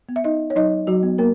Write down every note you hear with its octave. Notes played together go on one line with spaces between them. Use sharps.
B3
E5
D#4 D#5
C#5
F#3 D#4 D#5
F#3 F#4
B3
A#3 A#4